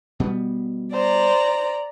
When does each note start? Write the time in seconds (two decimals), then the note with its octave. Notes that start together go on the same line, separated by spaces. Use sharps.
0.20 B2 G3 B3
0.93 C5 D5 A#5